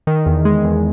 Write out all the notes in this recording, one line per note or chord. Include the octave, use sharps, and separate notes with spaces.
D#3
E2
G#3
E2